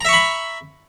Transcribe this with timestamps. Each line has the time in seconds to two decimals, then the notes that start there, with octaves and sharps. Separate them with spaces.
0.01 A#5
0.05 E5
0.09 C#6
0.13 B5